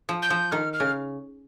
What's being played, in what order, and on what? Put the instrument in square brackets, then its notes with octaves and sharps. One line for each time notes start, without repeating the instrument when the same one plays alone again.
[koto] F3
[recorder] G6
[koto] F3
[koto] D#3 [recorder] F6
[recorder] F6
[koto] C#3